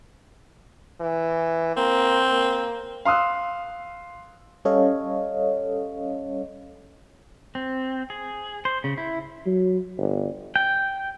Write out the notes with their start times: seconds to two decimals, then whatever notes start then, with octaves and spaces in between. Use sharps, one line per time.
1.01 E3
1.77 A#3 C4
2.32 A#3
3.05 F5 C6 D#6 E6 F#6
4.65 G3 C#4 A4 C#5 D#5 F5
7.55 C4
8.10 G#4
8.65 C5
8.84 C#3
8.98 E4
9.46 F#3
9.98 G1
10.56 G5